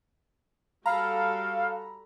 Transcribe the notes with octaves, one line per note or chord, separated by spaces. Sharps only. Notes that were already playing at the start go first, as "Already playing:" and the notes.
G3 F#4 A4 F5 A#5 B5